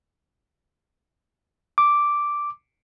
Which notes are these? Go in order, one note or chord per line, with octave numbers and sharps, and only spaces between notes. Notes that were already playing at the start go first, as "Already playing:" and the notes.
D6